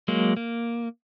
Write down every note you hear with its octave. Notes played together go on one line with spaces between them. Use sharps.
F#3 G#3 A#3
A#3